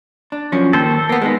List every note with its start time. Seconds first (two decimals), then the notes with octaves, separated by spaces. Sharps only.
0.32 D4
0.52 F#2 F3 C#4
0.73 D#2 A4 C5
1.09 A#3 B3
1.22 G#3 B3 D#4